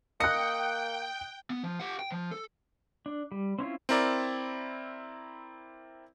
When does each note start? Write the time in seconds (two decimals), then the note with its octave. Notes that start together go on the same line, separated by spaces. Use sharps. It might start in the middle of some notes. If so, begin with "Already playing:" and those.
0.20 A#3 D#5 G5 F#6 C#7
1.50 B3
1.63 F3
1.80 G4 F#5
1.99 G5
2.12 F3
2.31 A4
3.06 D4
3.32 G3
3.59 C4 C#4 E4 F4
3.89 C4 E4 A#4 D5